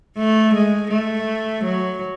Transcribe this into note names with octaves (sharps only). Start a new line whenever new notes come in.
A3
G#3
A3
F#3